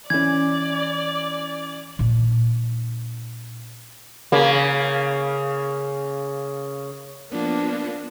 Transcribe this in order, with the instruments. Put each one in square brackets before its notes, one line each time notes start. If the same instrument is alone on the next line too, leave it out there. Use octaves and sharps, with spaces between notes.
[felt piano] E3 C#4 [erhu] D5 [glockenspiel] G#6
[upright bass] A#2 D4
[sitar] C#3 A#3
[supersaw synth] F3 B3 [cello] A#3 D4